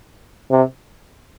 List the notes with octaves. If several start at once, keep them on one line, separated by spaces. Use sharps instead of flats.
C3